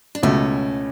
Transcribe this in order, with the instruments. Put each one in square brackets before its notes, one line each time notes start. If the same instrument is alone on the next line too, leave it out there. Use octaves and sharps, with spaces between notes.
[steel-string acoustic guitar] D4
[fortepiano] C#2 B2 A3 [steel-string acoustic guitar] C#4